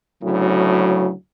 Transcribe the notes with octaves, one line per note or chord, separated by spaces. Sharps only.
D2 A2 C#3 F#3